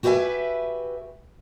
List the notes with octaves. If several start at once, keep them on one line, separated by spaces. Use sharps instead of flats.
F#4 G4 B4 C#5 E5 G#5